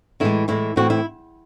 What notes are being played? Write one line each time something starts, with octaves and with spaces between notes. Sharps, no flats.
A2 E3 G#3 E4
A2 E3 G#3 E4
A2 E3 C4 F#4
E4